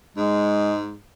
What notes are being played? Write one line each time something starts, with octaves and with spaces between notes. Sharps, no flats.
G#2 G#3